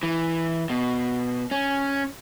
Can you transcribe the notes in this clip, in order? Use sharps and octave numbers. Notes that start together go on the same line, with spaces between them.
E3
B2
C#4